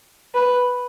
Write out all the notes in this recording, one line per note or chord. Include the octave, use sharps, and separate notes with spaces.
B4